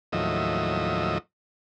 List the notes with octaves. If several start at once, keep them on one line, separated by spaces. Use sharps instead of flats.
D#2 A2 F3 F#3 D#5 E5